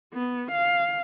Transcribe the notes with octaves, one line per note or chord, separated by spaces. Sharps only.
B3
F5